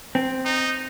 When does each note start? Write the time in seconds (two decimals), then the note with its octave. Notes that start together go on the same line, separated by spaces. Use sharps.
0.15 C4
0.45 D#4